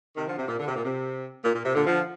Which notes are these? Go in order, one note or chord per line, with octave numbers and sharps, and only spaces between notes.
C3 D#3
D3 F3
C3
A#2
D3
C3
A#2
C3
A#2
A#2
C3
A#2 D3
D3 F3